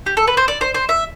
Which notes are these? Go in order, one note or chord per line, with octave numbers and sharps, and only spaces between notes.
G4
A4
B4
C5
D5
C5
C5
E5